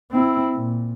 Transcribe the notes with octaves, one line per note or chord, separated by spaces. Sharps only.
C4 E4
A#2